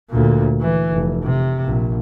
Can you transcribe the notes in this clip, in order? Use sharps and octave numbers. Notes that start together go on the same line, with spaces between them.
D2 A#2
E3
F1
C3
A#1